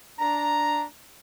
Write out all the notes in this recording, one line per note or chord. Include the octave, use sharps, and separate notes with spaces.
D4 A#5